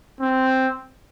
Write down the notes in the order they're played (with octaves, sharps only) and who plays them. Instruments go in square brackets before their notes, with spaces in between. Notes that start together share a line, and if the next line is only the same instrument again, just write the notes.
[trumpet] C4